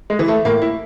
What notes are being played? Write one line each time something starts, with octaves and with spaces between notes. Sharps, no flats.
G#3
E3
A3
A2 A#3
E4